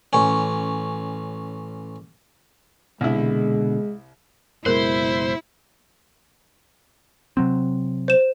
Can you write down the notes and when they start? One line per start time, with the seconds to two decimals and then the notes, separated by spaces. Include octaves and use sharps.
0.13 A1 C#4
3.01 C2 B2 D3 G#3 E4
4.66 F#1 B2 G#3 E4 A#4 C5
7.37 C3 F#3 C4
8.08 C5 E7